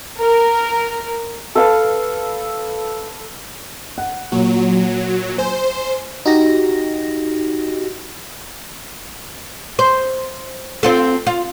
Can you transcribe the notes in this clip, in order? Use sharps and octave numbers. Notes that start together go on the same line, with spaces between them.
A#4
A4 B4 F5 A5
F#5
A#2 F#3
C5 G#5
D#4 F#4 G4 A#6
C5
C4 F4 A4
F4